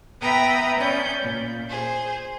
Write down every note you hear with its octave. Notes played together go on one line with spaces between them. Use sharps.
B3 B4 E5 G5 A#5 D#6
C#4 D5 G6
A#2
G#4 C5